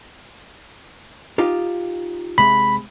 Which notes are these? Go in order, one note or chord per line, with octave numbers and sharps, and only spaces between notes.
D#4 F4 G4
C3 G#3 B5